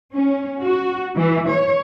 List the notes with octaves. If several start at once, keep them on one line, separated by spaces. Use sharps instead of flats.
C#4
F#4
E3
C#5